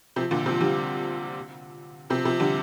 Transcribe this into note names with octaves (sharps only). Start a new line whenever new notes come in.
C3 F3
A#2 D3
C3 F3
D3 G3
C3 F3
C3 F3
D3 G3